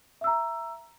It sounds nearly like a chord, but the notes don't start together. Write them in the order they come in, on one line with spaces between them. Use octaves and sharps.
E5 E6 A#5